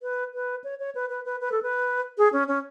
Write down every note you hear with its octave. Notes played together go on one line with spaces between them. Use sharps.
B4
B4
C#5
C#5
B4
B4
B4
B4
A4
B4
G#4
C#4
C#4